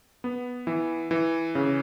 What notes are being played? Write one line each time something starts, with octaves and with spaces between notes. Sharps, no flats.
B3
E3
E3
C#3